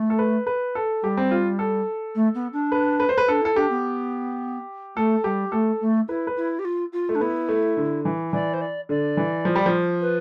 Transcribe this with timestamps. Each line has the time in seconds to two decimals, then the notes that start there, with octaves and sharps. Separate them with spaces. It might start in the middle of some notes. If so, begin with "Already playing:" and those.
Already playing: A3
0.10 A4
0.19 B4
0.47 B4
0.75 A4
1.03 G3 G4
1.17 C4
1.31 F4
1.59 A4
2.15 A3
2.35 B3
2.53 D4
2.72 B4
3.00 B4
3.09 C5
3.18 B4
3.28 D4 A4
3.41 E4 A4
3.56 D4 G4
3.70 B3
4.96 A3 A4
5.24 G3 G4
5.52 A3 A4
5.81 A3
6.08 E4 B4
6.27 B4
6.37 E4
6.59 G4
6.65 F4
6.93 F4
7.09 A3
7.15 D4
7.21 B3 E4
7.49 A3
7.77 D3
8.05 E3
8.33 E3 D5
8.54 C5
8.61 D5
8.89 D3 D5
9.17 E3
9.45 F3
9.56 G3
9.66 F3
10.02 B4